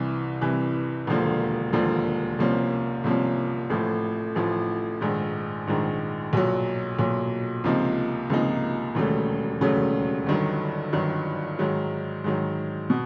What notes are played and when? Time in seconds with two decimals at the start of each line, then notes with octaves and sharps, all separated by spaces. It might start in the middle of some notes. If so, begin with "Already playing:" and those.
Already playing: C2 C3 E3
0.41 C2 C3 E3
1.07 E1 D#2 D3 F3 A#3
1.73 E1 D#2 D3 F3 A#3
2.39 C2 C3 F3 A#3 C#4
3.04 C2 C3 F3 A#3 C#4
3.70 A1 A2 F3
4.36 A1 A2 F3
5.01 A#1 G#2 D#3
5.67 A#1 G#2 D#3
6.33 B1 A#2 F#3
6.99 B1 A#2 F#3
7.64 C#2 C3 F3 A#3 D#4
8.30 C#2 C3 F3 A#3 D#4
8.95 E1 D#2 C#3 F#3 A3
9.61 E1 D#2 C#3 F#3 A3
10.26 G1 G2 D#3 F#3
10.93 G1 G2 D#3 F#3
11.59 G#2 D#3 F#3
12.24 G#2 D#3 F#3
12.90 B2